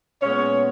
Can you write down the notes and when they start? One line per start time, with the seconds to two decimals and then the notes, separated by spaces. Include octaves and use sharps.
0.22 A#2 G#3 B3 C#4 C#5